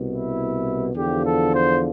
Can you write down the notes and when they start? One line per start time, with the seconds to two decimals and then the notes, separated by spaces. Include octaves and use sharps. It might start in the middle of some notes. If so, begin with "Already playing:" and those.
Already playing: C2 B2
0.08 E4
0.95 E2 D3 F3 G4
1.24 A4
1.53 C5